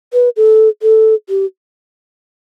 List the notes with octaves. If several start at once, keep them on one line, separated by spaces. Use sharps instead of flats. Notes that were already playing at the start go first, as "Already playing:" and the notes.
B4
A4
A4
G4